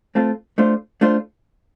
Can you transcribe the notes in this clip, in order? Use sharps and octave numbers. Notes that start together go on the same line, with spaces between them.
A3 C4 F4 A4
A3 D4 F4 C5
A3 D4 F4 C5